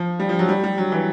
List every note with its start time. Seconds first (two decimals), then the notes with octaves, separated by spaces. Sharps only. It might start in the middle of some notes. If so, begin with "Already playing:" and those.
Already playing: F3
0.20 G3
0.29 F3
0.39 F#3
0.49 G3
0.64 G3
0.78 F#3
0.92 E3